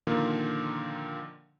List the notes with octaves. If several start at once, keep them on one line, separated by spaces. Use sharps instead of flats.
A#2 D3 D#3 F3 A#3 F4